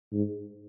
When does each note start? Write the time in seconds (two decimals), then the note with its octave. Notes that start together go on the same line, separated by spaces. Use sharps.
0.12 G#2